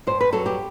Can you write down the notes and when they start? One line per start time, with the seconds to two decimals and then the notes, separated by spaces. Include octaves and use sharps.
0.07 G2 C5
0.21 B4
0.32 F#3 A4
0.46 G4